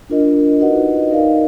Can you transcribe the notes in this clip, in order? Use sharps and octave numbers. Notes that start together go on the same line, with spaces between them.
D4 F4 A#4 D#5
D#4 F#4 B4 D#5 F#5
D#4 A#4 D5 F5